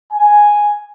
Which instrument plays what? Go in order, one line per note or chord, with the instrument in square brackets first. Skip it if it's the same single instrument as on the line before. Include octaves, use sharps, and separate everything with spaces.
[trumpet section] G#5